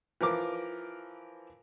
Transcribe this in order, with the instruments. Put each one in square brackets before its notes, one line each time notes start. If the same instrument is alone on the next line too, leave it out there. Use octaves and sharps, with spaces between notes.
[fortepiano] E3 F3 A#4 D6